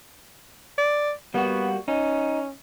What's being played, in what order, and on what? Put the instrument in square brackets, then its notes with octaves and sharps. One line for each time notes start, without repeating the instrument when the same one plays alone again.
[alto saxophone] D5
[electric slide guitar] G3 A#3 F#4 [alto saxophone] B3
[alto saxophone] C#4 [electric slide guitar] D#4